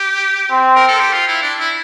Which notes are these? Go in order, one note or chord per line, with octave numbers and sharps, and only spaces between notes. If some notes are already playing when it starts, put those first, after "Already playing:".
Already playing: G4
C4
A#4
A4
G4
F4
E4
D4
E4